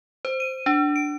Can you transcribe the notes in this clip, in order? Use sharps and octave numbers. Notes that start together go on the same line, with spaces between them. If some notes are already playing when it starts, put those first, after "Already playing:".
C5
D#7
D4
D7